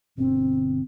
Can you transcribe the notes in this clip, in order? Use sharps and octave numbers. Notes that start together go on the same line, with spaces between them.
G1 B2 D3 C4